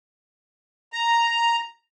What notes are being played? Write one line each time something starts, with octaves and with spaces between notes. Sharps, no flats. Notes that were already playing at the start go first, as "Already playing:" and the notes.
A#5